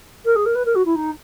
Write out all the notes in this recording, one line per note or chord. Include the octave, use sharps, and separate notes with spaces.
A#4
G#4
A#4
B4
A#4
F#4
E4
D#4